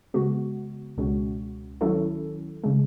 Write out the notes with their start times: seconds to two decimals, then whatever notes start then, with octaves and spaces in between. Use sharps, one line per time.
0.14 C#3 G#3 B3 F#4
0.97 C#2 B2 G#3 C#4 F#4
1.81 D#3 F#3 C#4 E4 A4
2.64 C#3 G#3